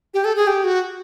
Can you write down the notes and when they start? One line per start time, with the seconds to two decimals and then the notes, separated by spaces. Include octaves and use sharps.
0.14 G4
0.25 A4
0.36 G#4
0.47 G4
0.64 F#4